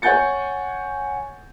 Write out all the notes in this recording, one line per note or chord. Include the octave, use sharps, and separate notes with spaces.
C#5 F#5 G#5 G6 A6 C#7